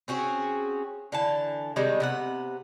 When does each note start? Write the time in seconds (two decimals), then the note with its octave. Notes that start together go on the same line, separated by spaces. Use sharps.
0.08 C4 C#4 F#4 G#4
1.12 D3 E3 A5
1.76 C3 D#3 G3 G#3
2.00 C3 B3 F#5